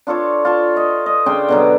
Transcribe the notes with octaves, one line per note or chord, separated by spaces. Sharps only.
D4 F4 A4 C#5
F4 A5
D#5
D#5
C#3 D4 G5 C6
B2 D3 F#3